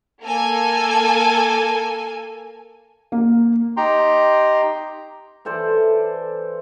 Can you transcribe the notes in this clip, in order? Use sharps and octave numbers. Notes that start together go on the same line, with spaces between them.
A#3 A4 G#5
A#3
D#4 G4 G5 A#5 C6
E3 A4 C5 D5